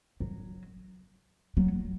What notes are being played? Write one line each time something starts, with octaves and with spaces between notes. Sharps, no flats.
F#3
F#3